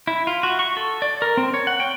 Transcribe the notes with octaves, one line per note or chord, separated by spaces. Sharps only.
E4
F4
F#4
C#6
A4
D5
A#4
C4
C#5
F#5
G5